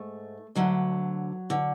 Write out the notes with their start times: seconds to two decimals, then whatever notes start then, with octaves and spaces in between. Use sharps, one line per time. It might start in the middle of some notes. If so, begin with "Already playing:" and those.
Already playing: G#2 A3
0.55 D2 D3 F#3
1.50 D3